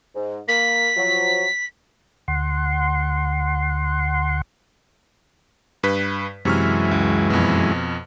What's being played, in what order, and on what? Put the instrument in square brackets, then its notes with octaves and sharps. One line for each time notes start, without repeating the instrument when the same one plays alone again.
[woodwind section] G#2
[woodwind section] A#3 [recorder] B6
[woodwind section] F3 F#3
[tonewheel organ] D2 F#5 C6
[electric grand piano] G2 B4 B6
[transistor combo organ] F#2 E3 G#3 [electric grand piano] C3 C#6 F6
[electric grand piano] C#2
F2 B2